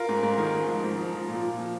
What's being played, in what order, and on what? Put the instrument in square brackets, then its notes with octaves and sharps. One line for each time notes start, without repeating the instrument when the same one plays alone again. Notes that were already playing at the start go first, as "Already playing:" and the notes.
Already playing: [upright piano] F4 A#4
G#2
G#2
D#3
G#2
F3
G#2
F3
F3
A#2
A#2
F3